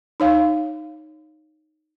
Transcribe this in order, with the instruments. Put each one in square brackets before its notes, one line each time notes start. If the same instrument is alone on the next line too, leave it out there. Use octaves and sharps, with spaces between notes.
[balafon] D#4 C#5 F5